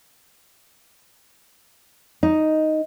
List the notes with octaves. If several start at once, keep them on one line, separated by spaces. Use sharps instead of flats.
D#4